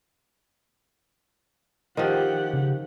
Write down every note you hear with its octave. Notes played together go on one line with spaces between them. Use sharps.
D#3 F3 G4 F#5
C#3